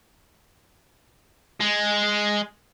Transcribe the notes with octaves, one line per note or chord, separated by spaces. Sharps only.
G#3